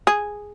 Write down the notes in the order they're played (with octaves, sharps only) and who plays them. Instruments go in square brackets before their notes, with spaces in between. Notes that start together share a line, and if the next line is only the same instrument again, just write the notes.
[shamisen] G#4